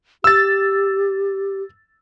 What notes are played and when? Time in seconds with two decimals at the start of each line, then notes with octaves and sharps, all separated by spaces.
0.24 G4 E6 A6